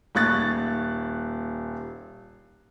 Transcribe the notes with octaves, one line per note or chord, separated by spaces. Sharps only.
D#1 C#6 F#6 A6